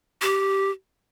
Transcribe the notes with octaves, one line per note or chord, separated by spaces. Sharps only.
G4